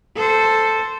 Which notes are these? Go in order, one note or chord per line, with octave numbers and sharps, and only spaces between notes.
A4 C5